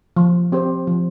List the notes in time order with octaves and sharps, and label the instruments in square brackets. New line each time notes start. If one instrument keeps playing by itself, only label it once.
[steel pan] F3
C4 G4 C5
F3